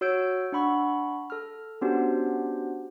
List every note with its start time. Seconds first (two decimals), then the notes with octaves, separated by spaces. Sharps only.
0.01 F#4 C#5 E6 G6 D7
0.52 D4 F#5 B5 C#6
1.30 A4 F6
1.81 B3 C#4 D4 F#4 G4 C5